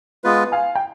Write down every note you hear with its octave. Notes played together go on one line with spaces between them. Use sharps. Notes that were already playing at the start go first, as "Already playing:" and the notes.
G#3 B3 F4 B4
F5 G#5
G5